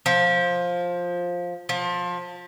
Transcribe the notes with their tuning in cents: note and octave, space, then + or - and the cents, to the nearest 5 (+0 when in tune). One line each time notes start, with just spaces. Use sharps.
F3 +10
F3 +25